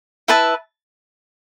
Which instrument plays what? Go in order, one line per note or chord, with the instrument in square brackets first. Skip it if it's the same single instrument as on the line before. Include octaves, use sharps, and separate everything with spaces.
[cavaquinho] E4 B4 E5 A5